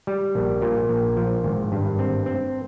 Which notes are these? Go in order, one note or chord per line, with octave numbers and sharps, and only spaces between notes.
G3
A#1
A#2
A#1
F3
G#1
G2
C4
C4